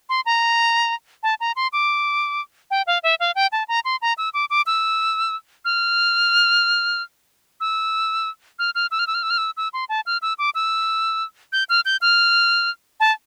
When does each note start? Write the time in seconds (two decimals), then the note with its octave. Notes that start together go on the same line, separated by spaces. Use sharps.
0.09 C6
0.26 A#5
1.23 A5
1.40 A#5
1.56 C6
1.73 D6
2.71 G5
2.87 F5
3.03 E5
3.20 F5
3.35 G5
3.52 A5
3.68 A#5
3.85 C6
4.02 A#5
4.18 E6
4.34 D6
4.50 D6
4.66 E6
5.65 F6
7.60 E6
8.59 F6
8.75 F6
8.91 E6
8.99 F6
9.07 E6
9.14 F6
9.23 E6
9.30 F6
9.38 E6
9.57 E6
9.73 C6
9.89 A5
10.06 F6
10.22 E6
10.39 D6
10.55 E6
11.52 G6
11.69 F6
11.85 G6
12.01 F6
13.00 A5